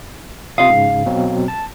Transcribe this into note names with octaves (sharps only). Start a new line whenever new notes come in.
C3 F4 F5 D#6
G#2 C#3
B2 F#3 C4
A5